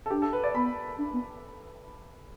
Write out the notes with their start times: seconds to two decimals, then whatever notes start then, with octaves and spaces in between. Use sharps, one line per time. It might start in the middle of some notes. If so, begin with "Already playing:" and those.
0.06 A4
0.10 D4 G4
0.22 A4
0.33 B4
0.44 D5
0.55 B3 B5
0.98 D4
1.13 B3